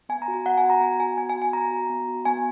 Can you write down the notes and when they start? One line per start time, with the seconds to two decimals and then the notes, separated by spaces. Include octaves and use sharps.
0.09 B3 G#5
0.22 A#5
0.28 F#4
0.34 G#5
0.46 B3 F#5
0.58 G#5
0.64 F#4
0.70 A#5
0.81 B3 G#5
0.99 F#4 G#5
1.18 B3 G#5
1.30 G#5
1.35 F#4
1.42 G#5
1.53 B3 A#5
1.72 F#4
1.90 B3
2.08 F#4
2.25 B3 G#5